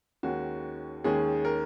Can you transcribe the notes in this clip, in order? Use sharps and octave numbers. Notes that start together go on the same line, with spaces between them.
D#2 D#3 G#3 C#4 F#4
D#2 D#3 G#3 C#4 G#4
A#4